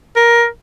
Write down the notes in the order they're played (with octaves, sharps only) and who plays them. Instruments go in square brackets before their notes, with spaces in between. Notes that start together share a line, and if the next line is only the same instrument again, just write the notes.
[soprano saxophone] A#4